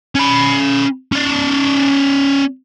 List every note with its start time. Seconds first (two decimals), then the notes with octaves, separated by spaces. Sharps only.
0.15 C#4 B5
1.12 C#4 D5